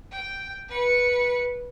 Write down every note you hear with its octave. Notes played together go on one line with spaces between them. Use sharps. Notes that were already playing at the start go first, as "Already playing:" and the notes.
G5
B4 C#7